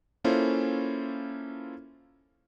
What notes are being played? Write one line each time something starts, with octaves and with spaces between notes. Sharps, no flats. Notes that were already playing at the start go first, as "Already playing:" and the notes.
A#3 C#4 E4 F4 A4 C5